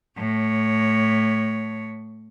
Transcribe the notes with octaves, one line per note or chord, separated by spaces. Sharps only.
A2 C#5